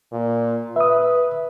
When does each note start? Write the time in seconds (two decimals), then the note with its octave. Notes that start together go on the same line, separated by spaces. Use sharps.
0.13 A#2
0.76 B4 E5 D#6